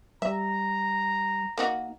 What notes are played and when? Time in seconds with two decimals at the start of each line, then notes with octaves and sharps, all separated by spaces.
0.22 G3 E5 A#5
1.58 A#3 D#4 F#4